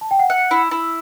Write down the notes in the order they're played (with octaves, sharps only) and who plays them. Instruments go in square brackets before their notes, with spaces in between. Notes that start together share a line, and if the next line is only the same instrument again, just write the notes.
[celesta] A5
G5
F#5
[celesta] E5 [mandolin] F#5
[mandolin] E4
E4